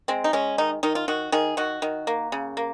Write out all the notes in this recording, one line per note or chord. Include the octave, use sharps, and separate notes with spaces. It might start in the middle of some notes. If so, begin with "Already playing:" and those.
G#3 C4
D#4
G#3 C#4
D#3 D#4
D#3 D#4
F4
D#3 F#4
D#3 G#4
D#3 F#4
D#3
A#3
C#3
A#3